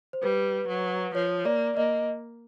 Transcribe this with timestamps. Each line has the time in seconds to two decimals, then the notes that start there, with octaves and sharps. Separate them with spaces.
0.13 C5
0.22 G3 B4
0.68 F#3
1.15 F3 C#5
1.45 A#3 D5
1.77 A#3 D#5